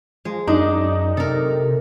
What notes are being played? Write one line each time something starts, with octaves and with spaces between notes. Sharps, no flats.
F3 G#3
F#2 D4 D#4
C3 A4 A#4